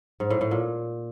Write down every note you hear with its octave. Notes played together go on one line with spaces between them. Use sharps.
G#2
A2
A2
A#2